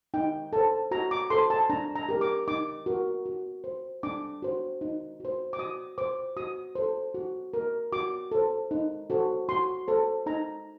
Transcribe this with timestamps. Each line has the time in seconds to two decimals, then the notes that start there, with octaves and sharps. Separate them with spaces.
0.14 D#4 G5
0.53 A4 C5 A5
0.91 F#4 A#5
1.11 D6
1.30 A4 C5 C6
1.50 A5
1.70 D4 A#5
1.95 A#5
2.09 G4 A#4
2.21 D6
2.48 D#4 D6
2.86 F#4 A#4
3.26 F#4
3.64 C5
4.03 D4 D6
4.42 F#4 C5
4.81 D#4
5.20 F#4 C5
5.53 D6
5.59 F#4 D#6
5.98 C5 D6
6.37 F#4 D#6
6.75 A4 C5
7.14 F#4
7.54 A#4
7.92 F#4 D6
8.32 A4 C5
8.71 D#4
9.10 F#4 A4 C5
9.49 F#4 C6
9.88 A4 C5
10.26 D#4 A#5